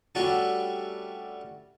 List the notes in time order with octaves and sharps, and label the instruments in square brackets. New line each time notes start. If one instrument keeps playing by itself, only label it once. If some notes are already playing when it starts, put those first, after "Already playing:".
[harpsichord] G3 A3 C#4 D4 F#4 A4